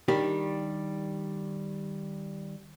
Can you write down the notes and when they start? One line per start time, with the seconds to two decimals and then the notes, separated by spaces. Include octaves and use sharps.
0.08 D#3 G3 D4 G4